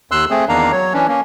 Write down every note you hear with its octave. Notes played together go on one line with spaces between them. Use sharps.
D#2 C6 E6 F#6
A3 C4 G#4
E2 D#3 A#3 D4 F5 A#5
F#3 C#5
E3 C#4 D4
A#3 C#4